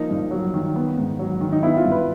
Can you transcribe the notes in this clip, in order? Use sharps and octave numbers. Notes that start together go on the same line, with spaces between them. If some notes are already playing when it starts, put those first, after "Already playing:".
Already playing: F3 A#3 D#4
G2
F#3
D#3
B3
G#2
F#3
D#3
D#4
B3 E4
F4
G2
B4